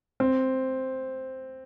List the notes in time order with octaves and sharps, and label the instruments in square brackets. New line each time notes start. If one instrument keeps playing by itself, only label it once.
[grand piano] C4